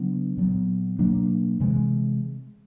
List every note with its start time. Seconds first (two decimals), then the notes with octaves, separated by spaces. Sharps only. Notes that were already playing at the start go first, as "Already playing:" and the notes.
Already playing: C#3 F#3 B3 D4
0.37 A#2 F#3 B3
0.99 B2 F#3 A#3 D4
1.60 C3 E3 G#3